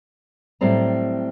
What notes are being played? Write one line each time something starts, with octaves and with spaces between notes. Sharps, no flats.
A2 F#3 G3 C4 A#5